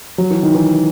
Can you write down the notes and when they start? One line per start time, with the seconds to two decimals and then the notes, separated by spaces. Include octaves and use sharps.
0.18 F#3
0.31 E3
0.43 D#3
0.55 E3